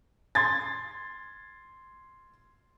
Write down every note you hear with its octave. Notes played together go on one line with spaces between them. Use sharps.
C6 G#6 A6